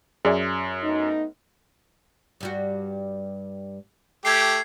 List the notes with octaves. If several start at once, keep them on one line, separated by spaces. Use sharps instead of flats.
F#2 G#4 D5 E5
A3 B3 D#4
G2 G3 F#4
A3 G4 G#6 C7